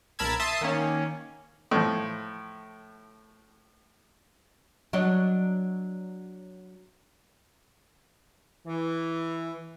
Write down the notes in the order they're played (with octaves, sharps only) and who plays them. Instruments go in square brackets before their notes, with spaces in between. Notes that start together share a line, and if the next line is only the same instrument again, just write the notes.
[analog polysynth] B1 A#4 A5 B5 E6 G#6
E5 A5 C6 D#6
D#3 A#3 C#4
[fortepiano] A2 F3
[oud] F#3 D4 D#5
[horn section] E3